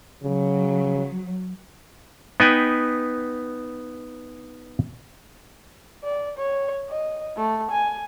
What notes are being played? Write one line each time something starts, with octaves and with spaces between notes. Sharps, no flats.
C#3 F#3
B3 D#4 B4 G5 G#5
D5
C#5
D#5
A3
G#5